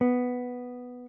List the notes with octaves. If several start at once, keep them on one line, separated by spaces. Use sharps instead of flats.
B3